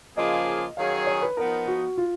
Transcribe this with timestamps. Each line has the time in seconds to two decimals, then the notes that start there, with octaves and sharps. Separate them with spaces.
0.17 C#3 F3 A#3 F4 G#4 D#5
0.77 D#3 F#3 C#4 G#4 F5
1.07 C#5
1.22 B4
1.37 F3 B3 D#4 A#4
1.67 F#4
1.97 F4